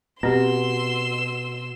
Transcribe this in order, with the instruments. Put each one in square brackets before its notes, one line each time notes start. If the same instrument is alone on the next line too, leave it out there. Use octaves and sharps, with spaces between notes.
[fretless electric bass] B2 [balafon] C4 G4 [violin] C6 E6